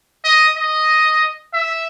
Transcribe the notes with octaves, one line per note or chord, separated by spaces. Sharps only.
D#5
D#5
E5